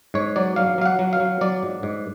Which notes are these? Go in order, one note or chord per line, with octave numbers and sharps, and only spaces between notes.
G#2 C#5
F#3 D5
F#3 F5
F#3 F5
F#5
F#3
F5
F#3
F#3 D5
G#2
G#2